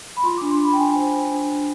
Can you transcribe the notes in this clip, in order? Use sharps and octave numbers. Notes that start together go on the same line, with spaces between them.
B5
F4 C6
D4 D6
C6
D4 B5
G5
D4 G#5
C5
C5
D4
D4